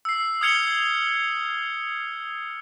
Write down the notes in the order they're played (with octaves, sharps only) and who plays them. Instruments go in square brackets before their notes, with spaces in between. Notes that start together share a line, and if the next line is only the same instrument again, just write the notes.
[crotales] E6 C7
D#6 F6 G#6 C#7 F7 G7